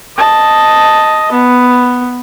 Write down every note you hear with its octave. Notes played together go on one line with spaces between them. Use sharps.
D#5 A5
B3